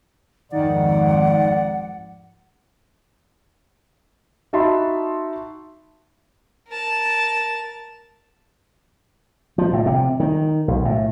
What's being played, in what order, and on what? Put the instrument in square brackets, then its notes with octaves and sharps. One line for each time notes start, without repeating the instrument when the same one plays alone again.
[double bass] G#1 F2 [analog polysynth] D#3 [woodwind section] D5 [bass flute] F#5
[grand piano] D#4 F#4 E5 A5 B5 C6
[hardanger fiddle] A#4 A5
[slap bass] F3
A2
C3
D#3
B1
A2